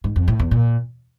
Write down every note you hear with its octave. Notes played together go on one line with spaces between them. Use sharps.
G#2
F2
A2
E2
A#2